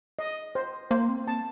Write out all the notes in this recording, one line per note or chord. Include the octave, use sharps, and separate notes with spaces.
D#5
C5
A#3 C5
C4
A#3 A5